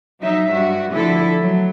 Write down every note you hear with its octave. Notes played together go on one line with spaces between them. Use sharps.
F#3 D#4 E5
G2 F#4
D3 F3 A3 E4 A4
F#3